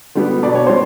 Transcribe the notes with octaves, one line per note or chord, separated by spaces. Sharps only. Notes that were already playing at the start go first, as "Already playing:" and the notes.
D3 G3 B3
B2 D5
C#5
G3 C5